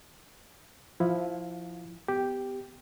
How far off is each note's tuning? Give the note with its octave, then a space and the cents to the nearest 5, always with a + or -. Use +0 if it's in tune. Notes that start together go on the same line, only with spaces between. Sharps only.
F3 +0 E4 +0 F5 +25
B3 +30 G4 +0